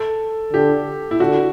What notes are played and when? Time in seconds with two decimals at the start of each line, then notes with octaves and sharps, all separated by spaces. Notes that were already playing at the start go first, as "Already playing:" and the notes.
Already playing: A4
0.53 D3 G4
1.11 E4
1.19 D3 F#4